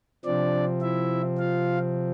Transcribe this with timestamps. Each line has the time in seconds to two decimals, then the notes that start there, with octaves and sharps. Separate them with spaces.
0.25 C3 F3 C4 D4 D5
0.82 E4 E5
1.38 F4 F5